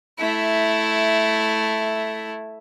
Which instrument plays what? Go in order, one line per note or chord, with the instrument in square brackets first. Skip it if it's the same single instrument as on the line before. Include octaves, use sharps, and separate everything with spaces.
[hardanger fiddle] A3 E4